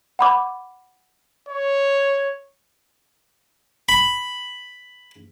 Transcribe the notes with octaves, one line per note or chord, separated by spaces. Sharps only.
F#5 B5 D6
C#5
B5